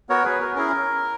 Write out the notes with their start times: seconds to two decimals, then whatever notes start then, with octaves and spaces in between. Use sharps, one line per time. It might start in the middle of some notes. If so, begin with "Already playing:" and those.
0.09 B3 F#4 A#4 C#5
0.24 G#4 B4
0.41 A#4
0.56 C#4 E4 G#4 A#4